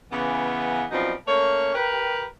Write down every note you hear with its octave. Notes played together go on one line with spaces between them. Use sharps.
C#3 E3 B3
F#2 B2 F3 G3 C4 D#4
A3 A#3 C#4 C#5
G4 A#4 B4